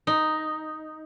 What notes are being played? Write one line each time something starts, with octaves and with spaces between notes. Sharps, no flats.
D#4